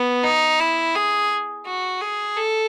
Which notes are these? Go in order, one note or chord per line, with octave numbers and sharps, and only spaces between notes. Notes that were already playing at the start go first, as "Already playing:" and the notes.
Already playing: B3
D#4
E4
G#4
F#4
G#4
A4